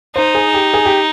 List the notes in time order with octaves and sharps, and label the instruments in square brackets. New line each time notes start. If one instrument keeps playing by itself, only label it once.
[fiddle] D#4 [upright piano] C5
[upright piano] G#4
G4
G#4
G4